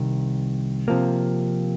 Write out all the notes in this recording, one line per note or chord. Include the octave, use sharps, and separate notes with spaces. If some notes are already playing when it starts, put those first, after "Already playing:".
Already playing: C2 C3 D#3
C3 F3 A#3